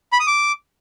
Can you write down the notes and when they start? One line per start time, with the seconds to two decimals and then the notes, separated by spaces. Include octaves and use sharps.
0.13 B5
0.20 D#6
0.27 D6